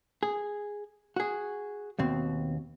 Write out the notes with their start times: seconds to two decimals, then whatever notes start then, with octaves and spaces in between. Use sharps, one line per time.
0.23 G#4
1.16 F#4 G#4
1.99 D#2 B2 C4